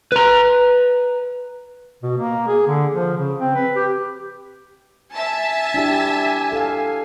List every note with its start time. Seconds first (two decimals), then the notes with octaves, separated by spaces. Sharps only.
0.12 B4 A#5
2.03 B2
2.18 A#3
2.48 G#4
2.67 D3
2.92 F3
3.16 C#3
3.40 C4
3.55 B4
3.76 G4
5.15 E5 G#5 A5
5.74 D4 E4 G4
6.52 A4 F5